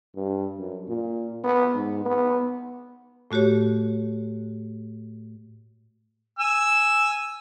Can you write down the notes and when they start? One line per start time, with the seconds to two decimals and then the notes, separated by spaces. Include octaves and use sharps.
0.15 G2
0.58 F#2
0.88 A#2
1.44 B3
1.75 G#2
2.05 B3
3.31 A2 A3 F#4 G4 C#5
6.39 G#5 E6